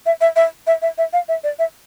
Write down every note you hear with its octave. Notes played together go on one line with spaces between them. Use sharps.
E5
E5
E5
E5
E5
E5
F5
E5
D5
E5